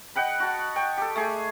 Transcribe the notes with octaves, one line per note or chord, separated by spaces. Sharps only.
D#5 F#5 G5 B5
F#4 A5
G5 C#6
G4 A4
A3 G#4